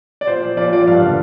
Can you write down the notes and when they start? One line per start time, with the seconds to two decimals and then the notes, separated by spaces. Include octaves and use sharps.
0.21 D5
0.27 A#2 C5
0.42 F3
0.57 A#2 D5
0.72 F3 D5
0.87 G2 F5
1.02 D3 F3